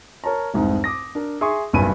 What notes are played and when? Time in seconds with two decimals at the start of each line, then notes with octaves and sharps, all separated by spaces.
0.24 A#4 C#5 A5 A#5
0.54 F1 C2 G#2 D#4
0.84 D6 D#6 A#6
1.15 D4 A#4
1.41 G#4 E5 C6 C#6 D#6
1.73 F#1 B1 G2 G#5 B5 D#7